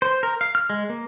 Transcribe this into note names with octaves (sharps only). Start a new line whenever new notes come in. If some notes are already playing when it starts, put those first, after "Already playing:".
C5
A#4
F5
F6
G#3
A#3